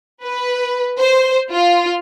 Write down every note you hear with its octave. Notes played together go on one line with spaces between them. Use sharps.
B4
C5
F4